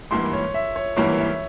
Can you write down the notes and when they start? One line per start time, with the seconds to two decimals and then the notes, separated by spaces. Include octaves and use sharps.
0.11 G#1 G2 E3 A#3 E4 C6
0.33 C#5
0.54 E5
0.76 C#5
0.96 G#1 G2 E3 A#3 E4 C#5
1.18 E5